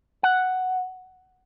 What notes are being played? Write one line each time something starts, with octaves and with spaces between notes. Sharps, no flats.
F#5